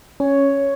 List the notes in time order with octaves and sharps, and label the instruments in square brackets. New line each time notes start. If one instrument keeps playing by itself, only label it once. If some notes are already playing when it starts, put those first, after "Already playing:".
[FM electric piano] C#4 [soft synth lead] C#5